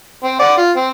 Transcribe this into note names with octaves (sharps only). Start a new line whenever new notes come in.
C4
D5 F#5
F4
C4